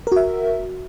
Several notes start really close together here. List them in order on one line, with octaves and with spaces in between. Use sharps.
A#4 F#4 E5